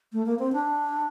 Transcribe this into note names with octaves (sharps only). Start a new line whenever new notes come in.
A3
A#3
C4
D4